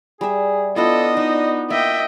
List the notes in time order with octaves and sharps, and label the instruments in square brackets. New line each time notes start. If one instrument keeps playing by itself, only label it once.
[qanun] G3 E5 [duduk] G#4
[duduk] B3 [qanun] D4 E4 F4 [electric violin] A4 [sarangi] D#5
[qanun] D4 [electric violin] D#4
[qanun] A#3 [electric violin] D#5 G5 [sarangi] E5